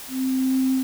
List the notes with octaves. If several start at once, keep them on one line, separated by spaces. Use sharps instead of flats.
C4